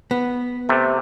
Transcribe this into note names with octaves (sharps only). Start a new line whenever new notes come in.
B3
C3 A3